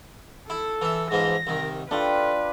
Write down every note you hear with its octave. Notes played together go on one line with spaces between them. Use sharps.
E4 A4
E3 E5
G#2 E3 F3 A#6
C2 D#3
A3 D4 F4 G4 B4